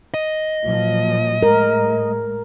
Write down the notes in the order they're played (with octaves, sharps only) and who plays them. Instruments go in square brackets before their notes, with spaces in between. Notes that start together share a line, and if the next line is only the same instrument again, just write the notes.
[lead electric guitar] D#5
[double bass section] A#2 F3 F#3
[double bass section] A2 G#3 [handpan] A#4